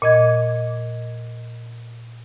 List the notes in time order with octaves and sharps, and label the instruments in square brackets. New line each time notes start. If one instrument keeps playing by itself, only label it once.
[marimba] A#2 D#5 G#6